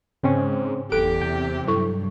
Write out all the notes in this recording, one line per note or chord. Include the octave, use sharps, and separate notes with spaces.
G#2 C#3 C4 C#4
F#1 E2 G4 A4 D7
C3 G5
G2 F#3 E4 A4 C#6